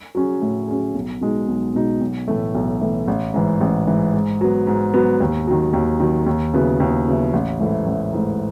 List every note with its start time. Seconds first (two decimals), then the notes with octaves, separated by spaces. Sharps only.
0.15 F#3 C#4 G#4
0.42 A2
0.68 F#3 C#4 G#4
0.95 B1
1.21 B2 G#3 D#4
1.48 B1
1.75 B2 G#3 D#4
2.01 B1
2.28 A2 E3 A3
2.55 B1
2.81 A2 E3 A3
3.08 A1
3.34 G#2 E3
3.61 A1
3.87 G#2 E3
4.14 G#2
4.41 F#3 B3
4.67 G#2
4.94 F#3 B3
5.20 D#2
5.47 D#3 F#3
5.73 D#2
6.00 D#3 F#3
6.26 D#2
6.53 C#3 F#3 B3 E4
6.80 D#2
7.07 C#3 F#3 B3 E4
7.33 A1
7.59 G#2 E3 A3 E4
7.86 A1
8.13 G#2 E3 A3 E4